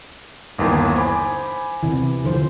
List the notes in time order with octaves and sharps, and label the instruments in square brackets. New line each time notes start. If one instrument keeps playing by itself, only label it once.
[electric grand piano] G1 D#2 E3
[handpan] C5 [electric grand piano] G#5 B5 D6
[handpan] C3 E3
D3 F3 C5